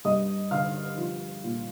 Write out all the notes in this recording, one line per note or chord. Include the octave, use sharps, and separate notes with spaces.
G2 D#5 D#6
D3 F5 F6
F3
A#2